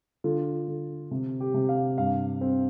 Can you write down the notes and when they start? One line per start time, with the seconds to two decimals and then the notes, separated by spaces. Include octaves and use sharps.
0.24 D3 F4
0.68 D3
1.11 C3
1.40 G4
1.54 C3
1.69 F5
1.98 G2 F5
2.41 C4